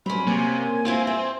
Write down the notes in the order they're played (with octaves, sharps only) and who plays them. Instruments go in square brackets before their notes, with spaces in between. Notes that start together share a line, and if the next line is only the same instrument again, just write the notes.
[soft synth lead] F#3 [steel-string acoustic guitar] C4 C#4 [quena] B5
[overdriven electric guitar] C3 [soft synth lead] A#3 [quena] G#5
[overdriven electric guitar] C4 [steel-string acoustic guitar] E4 F4 C5
[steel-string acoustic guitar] C5